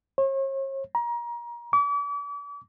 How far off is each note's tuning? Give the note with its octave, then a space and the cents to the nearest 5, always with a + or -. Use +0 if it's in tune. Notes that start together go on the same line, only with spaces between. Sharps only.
C#5 -40
A#5 +30
D6 -40